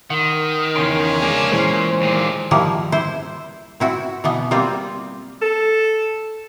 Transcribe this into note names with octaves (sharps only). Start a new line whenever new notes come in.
D#3 F#5 C6
E2 C#3 C#4 G5 C6
G#3 A#3 D4
A#2 E3 G#3 C5
D#2 A#2 C5
D#3 F3 G3 A#3 E4
E4 C5
C4 E4 F#4
B2 E3 B3
G3 A#3 C4 F4
A4